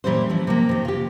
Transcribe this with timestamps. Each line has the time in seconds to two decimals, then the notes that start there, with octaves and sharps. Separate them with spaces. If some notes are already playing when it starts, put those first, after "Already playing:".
0.04 A#2 E3 G3 C#4 C5
0.30 E3 F3 A3 A#3
0.47 C3 F3 A#3
0.69 C3 D#3
0.85 F4 G4